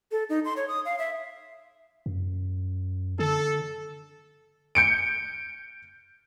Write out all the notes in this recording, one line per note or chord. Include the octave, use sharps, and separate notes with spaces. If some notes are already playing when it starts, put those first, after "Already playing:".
A4
D#4
C6
C#5
D#6
F5
E5
F#2
D3 A4
G6 C#7 D7